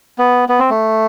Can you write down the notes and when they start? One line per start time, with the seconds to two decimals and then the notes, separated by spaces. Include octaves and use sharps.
0.18 B3
0.49 B3
0.59 C4
0.70 A3